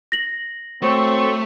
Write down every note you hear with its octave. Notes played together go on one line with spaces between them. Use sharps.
A#6 F#7
F#3 A3 C4 C5 C#6